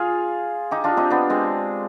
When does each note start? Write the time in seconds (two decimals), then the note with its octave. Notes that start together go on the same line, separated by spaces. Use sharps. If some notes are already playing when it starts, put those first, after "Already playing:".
Already playing: F4 G#4
0.71 D#4 G4
0.84 D4 F4
0.97 C4 D#4
1.10 B3 D4
1.30 G#3 C4